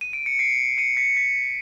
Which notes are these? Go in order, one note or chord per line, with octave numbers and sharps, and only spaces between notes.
D#7
D7
C#7
C7 D7
C#7 D#7
B6 C#7
B6